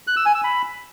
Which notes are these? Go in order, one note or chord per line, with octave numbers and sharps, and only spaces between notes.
F#6
E6
G#5
E6
B5